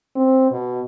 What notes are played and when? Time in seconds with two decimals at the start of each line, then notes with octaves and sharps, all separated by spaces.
0.15 C4
0.51 B2